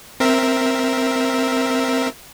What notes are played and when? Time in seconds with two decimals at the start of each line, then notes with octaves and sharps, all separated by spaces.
0.20 C4 A#4 E5